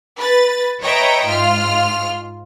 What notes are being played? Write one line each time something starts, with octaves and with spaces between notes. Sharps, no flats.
B4 A6
B4 C#5 D#5 E5 G5 A#5
G#2 F4 F6